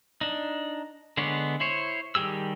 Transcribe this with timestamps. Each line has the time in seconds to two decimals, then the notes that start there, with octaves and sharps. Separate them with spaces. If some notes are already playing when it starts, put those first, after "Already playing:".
0.21 D4 D#4
1.17 D3 G#3 B3 D4 C#5
1.60 E4 C5 C#5
2.15 D#3 G3 G4 G#4 E6